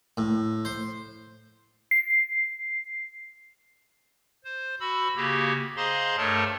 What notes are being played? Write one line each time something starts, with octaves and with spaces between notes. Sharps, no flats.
A2
C5
C7
C5
F#4 B5 E6
C#3 A#3 F#4 G4
G#4 C5 D#5 F5 A#5 C6
G2 A3 A4 A#4 C#5 A5